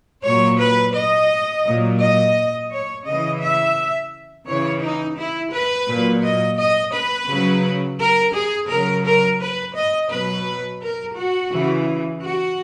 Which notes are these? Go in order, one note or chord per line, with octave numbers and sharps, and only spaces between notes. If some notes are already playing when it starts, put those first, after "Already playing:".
A#2 F#3 C#5
B4
D#5
A#2 F#3
D#5
C#5
C#3 E3 D#5
E5
C#3 E3 C#5
D#4
E4
B4
A#2 F#3
D#5
D#5
B4
C#3 F#3
A#4
G#4
C#3 F#3 A#4
A#4
B4
D#5
B2 F#3 B4
A#4
F#4
C#3 E3
F#4